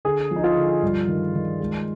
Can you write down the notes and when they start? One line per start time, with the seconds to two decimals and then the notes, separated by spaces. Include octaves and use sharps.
0.05 D3 G#4
0.31 F3
0.36 D#4
0.44 F4
0.56 D3
0.82 G2
1.08 D#3
1.34 D#3
1.60 G#3